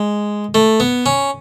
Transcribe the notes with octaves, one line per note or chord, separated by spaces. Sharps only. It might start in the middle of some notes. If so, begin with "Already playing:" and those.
Already playing: G#3
A3
B3
C#4